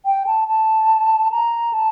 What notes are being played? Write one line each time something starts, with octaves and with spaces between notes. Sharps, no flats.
G5
A5
A5
A#5
A5